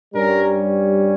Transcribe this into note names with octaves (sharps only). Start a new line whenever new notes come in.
G2 G3 C#4 A#4